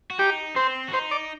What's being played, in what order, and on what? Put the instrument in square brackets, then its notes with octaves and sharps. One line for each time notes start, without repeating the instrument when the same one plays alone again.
[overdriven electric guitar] F#4
[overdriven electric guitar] D#4 [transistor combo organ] G4
[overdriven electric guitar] C4 [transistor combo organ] C5
[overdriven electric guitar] F#4
[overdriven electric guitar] D#4 [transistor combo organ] C5
[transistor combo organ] D5